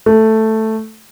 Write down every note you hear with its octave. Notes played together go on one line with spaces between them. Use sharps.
A3